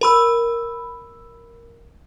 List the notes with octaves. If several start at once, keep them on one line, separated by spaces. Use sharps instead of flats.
A#4 B5 E6